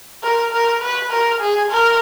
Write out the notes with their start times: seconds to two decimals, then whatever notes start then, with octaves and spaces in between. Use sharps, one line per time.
0.23 A#4
0.53 A#4
0.82 B4
1.11 A#4
1.41 G#4
1.71 A#4